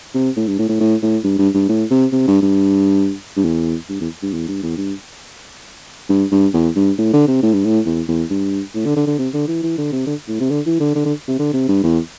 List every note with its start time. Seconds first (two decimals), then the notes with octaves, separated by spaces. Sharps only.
0.15 C3
0.37 A2
0.47 G2
0.58 A2
0.69 A2
0.80 A2
1.02 A2
1.24 G2
1.39 G2
1.54 G2
1.69 A2
1.91 C3
2.13 C3
2.28 G2
2.42 G2
3.37 G2
3.45 E2
3.89 G2
4.00 E2
4.23 G2
4.34 E2
4.48 G2
4.63 E2
4.77 G2
6.09 G2
6.32 G2
6.54 E2
6.76 G2
6.98 A2
7.13 D3
7.28 C3
7.42 A2
7.53 G2
7.65 A2
7.86 E2
8.08 E2
8.30 G2
8.75 A2
8.86 D3
8.96 D3
9.07 D3
9.18 C3
9.33 D3
9.48 E3
9.63 E3
9.78 D3
9.92 C3
10.07 D3
10.28 A2
10.40 C3
10.51 D3
10.66 E3
10.80 D3
10.95 D3
11.05 D3
11.28 C3
11.39 D3
11.54 C3
11.68 G2
11.83 E2